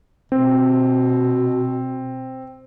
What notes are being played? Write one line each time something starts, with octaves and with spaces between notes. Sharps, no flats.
B2 C4